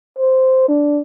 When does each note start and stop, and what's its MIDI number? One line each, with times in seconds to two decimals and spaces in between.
0.19 0.68 72
0.68 1.02 62